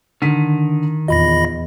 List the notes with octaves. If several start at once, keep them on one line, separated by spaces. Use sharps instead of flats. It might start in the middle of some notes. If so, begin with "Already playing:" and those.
D3 D#3 B6 D#7
E2 A#2 D#5 B5 A#6